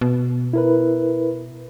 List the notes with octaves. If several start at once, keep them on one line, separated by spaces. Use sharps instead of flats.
B2
E4 A#4 B4